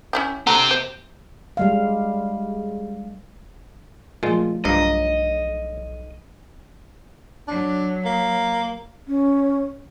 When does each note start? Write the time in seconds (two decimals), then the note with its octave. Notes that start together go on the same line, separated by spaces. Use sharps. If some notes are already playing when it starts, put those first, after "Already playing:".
0.13 C#4 E4 G4
0.47 D3 C4 F#4 G4 A#5
0.71 C5
1.57 G3 G#3 F5
4.23 A#2 F3 G#3 A3 F4
4.65 B1 G2 F3 D#5 A#5
7.48 F#3 D4
8.05 A#3
9.08 C#4